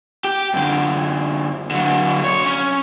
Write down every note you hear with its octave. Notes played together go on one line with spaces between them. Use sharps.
G4
F#2 D3
D3 F#3
B1 C#5
C#4